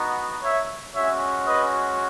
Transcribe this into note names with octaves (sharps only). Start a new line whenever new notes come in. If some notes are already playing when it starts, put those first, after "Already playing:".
Already playing: B3 D#4 F#4
C#5 E5
G#3 C#4 F#4 C#5 E5
B4 D#5